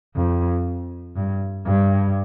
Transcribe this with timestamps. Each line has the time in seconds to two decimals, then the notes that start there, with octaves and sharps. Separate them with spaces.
0.16 F2
1.16 G2
1.66 G2